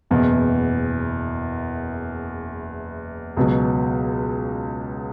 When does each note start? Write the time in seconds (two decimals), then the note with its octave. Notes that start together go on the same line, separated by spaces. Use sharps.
0.11 F#1 E2 B2
3.37 C#2 B2 F#3